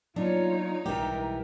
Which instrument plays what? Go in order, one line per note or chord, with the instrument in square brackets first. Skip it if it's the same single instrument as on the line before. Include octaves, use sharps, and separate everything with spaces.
[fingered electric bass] F#3 A#3 B3 [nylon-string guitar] D4 [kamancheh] D#4 [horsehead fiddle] F4 C#5
[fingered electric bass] B1 G3 G#3 [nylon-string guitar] E3 G4 [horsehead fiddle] A#4